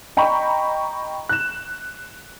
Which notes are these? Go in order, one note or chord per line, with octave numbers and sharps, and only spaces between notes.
D#5 G5 A#5 B5 C#6
F#6 E7